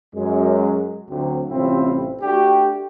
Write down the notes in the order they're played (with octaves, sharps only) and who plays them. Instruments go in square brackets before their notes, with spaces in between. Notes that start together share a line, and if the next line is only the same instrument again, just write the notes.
[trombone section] F#2 G#3
D2 F#3 C4
A1 C3 G3 C4 E4 F4
A3 D4 F#4 G4